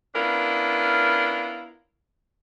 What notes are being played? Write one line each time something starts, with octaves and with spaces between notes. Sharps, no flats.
B3 C#4 D4 E4 F4 A#4